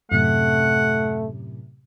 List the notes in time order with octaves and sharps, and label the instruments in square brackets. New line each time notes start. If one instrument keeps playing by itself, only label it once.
[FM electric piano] F#2 A2 C3 [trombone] A3 [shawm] F#5